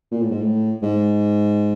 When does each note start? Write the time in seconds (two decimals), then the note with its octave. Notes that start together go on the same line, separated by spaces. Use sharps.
0.11 A#2
0.22 A2
0.31 G#2
0.41 A2
0.83 G#2